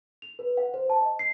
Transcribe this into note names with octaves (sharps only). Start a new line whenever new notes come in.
F7
B4
F#5
C5
A5
D#5
C7